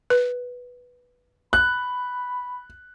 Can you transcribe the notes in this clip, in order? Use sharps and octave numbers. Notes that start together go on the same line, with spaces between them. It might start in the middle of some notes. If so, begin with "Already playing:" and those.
B4
B5 F#6